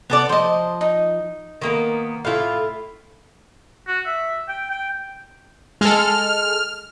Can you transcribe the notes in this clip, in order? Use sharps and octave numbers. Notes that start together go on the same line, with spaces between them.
B3 A4 D5
F3 C5 D#5
D#4
D#3 A#3 B3
A2 E4 F4 F5
F#4
E5
G5
G5
G#3 A4 F6